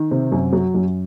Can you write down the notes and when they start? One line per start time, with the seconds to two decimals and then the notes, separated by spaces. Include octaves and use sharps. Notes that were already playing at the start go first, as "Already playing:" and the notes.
Already playing: D#3
0.11 C3
0.32 F#2
0.53 F#3
0.75 F#2